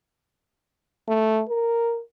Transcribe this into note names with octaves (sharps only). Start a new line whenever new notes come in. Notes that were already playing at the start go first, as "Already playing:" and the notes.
A3
A#4